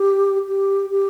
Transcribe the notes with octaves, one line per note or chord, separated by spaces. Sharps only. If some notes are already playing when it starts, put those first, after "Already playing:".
Already playing: G4
G4
G4